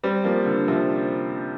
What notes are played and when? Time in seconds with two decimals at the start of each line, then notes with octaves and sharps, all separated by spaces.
0.03 G3 C4
0.24 F3 A#3
0.46 D3
0.68 C3 F3